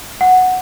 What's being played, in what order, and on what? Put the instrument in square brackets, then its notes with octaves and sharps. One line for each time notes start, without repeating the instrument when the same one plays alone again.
[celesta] F#5